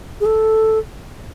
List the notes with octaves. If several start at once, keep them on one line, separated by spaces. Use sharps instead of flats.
G#4
A4